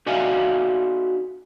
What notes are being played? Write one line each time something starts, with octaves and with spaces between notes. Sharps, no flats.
D#4 F#4 D5 E5 F5 G#5